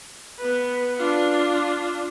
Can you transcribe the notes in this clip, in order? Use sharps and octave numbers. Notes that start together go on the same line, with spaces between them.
B3 B4
D4 F4